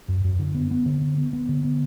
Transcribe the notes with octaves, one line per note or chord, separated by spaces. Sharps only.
F#2
F#2
D3
B3
B3
D3
B3
B3
B3
D3
B3